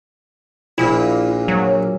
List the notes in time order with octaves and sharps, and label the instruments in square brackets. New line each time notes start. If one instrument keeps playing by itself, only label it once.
[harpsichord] A#1 A#2 [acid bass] E4
[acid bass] F#3